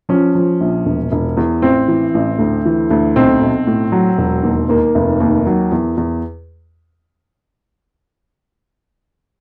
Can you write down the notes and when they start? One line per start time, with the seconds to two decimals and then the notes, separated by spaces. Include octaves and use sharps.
0.09 F3 C#4
0.35 F3
0.61 A#1
0.86 E1
1.12 E1
1.37 E2
1.62 A1 C4
1.88 E3
2.14 A1
2.39 D2
2.65 E3
2.91 D2
3.16 B1 C4
3.41 B1
3.67 A2
3.92 F#3
4.18 E1
4.43 D#2
4.69 D#2 A#3
4.95 F1
5.20 D#2
5.46 F#3
5.72 E2
5.97 E2